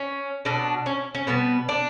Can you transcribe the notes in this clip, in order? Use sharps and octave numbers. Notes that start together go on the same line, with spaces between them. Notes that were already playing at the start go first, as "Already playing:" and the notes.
Already playing: C#4
B2 F#3 D4
C#4
C#4
B2 G3 B3
D4